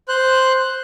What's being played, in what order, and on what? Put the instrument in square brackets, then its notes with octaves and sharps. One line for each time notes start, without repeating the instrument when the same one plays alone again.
[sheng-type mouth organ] C5 F#6